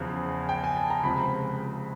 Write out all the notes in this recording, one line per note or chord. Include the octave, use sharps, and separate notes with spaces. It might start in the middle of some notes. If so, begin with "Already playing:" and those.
Already playing: E2 C#3 F3
G5
G#5
A5
A#5
C#2 C3 F3 B5